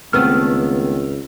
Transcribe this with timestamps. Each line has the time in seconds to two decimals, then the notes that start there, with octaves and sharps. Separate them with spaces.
0.13 C#2 D#3 A3 B3 C4 E6 F6